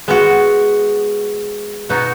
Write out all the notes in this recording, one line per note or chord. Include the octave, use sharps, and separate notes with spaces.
G#3 B3 F#4
B2 B3 D#4 F#4